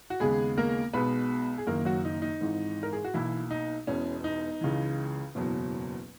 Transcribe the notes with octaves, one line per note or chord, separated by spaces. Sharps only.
F#4
D#2 C#3 G#3 B3 G#4
A#3 A#4
B1 B2 G#3 B3 B4
G#4
F#1 F#2 D#3 A#3 A#4
F#3 F#4
D#4
D#4
G#1 G#2 E3
A#4
G#4
F#4
B1 B2 E3 A#3 E4
D#4
E1 E2 B2 C#4
D#4
C#2 C#3 E3
F#1 E2 B2 F#3